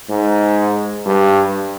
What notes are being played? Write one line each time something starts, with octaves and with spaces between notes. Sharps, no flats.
G#2
G2